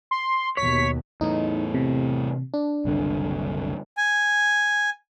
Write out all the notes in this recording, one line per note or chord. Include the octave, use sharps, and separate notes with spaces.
C6
D#2 B2 C#5 B6
E2 A2 D#4
C3
D4
F#1 C2 D3
G#5